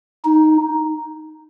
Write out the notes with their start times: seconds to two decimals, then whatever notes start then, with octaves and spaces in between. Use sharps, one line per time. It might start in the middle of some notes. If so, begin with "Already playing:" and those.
0.25 D#4